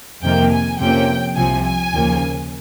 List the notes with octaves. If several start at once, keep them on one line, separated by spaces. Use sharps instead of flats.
F2 C3 D#3 A#3 G5
G#5
F2 C3 F3 A#3 C#4 G5
C2 C3 F3 G#5
G#5
D#2 C#3 F3 A#3